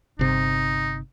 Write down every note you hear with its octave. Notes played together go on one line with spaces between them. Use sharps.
G1 C3 D#4